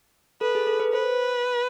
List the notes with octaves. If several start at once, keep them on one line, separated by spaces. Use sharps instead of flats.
A4 B4
G#4
A4
B4
B4 C5